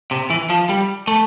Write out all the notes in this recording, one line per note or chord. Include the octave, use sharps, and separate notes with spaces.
C3
E3
F3
G3
A3